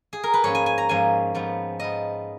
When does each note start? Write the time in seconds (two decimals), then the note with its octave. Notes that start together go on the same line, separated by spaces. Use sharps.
0.13 G#4
0.23 A#4
0.34 B4
0.44 G#2 F3 A#3 C#4 C#5
0.55 G#5
0.66 G#5
0.78 A#5
0.89 G#2 F3 A#3 C#4 G#5
1.34 G#2 F3 B3
1.80 G#2 F3 B3 D#5